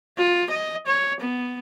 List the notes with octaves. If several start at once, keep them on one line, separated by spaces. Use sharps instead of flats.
F4
D#5
C#5
B3